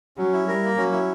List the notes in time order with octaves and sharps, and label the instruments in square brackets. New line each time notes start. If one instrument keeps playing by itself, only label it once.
[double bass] F#3 [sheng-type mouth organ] C#4
[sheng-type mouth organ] E4
[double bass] G3 [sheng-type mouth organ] A#4
[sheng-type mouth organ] A#3
[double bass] F#3 [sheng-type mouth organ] C#4
[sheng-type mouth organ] E4